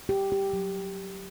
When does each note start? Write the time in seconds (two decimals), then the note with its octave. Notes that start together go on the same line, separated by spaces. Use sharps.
0.09 G4
0.32 G4
0.53 F#3